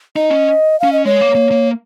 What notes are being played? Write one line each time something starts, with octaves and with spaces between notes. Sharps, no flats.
D#4 D#5
C#4
C#4 F5
D#5
G#3 C#5
A#3
A#3
A#3